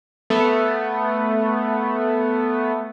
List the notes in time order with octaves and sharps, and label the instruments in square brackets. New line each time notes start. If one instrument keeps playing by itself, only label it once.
[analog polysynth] A3 B3